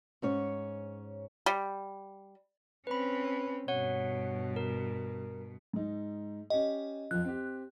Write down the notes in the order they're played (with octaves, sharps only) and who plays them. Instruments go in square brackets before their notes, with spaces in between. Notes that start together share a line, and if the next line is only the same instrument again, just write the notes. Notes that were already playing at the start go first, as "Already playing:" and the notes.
[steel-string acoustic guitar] G#2 C#4 C#5
[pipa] G3
[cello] C4 C#4 [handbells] B4 B5
[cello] G2 B2 [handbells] C#5 F#5
[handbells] A#4
[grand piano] G#2 D#4
[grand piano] C#4 G4 [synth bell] D#5
[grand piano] F2 F3 [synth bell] F#6
[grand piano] C4 G4